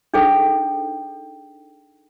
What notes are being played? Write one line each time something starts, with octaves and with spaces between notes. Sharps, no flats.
D4 D#4 G#4 A4 C5 G5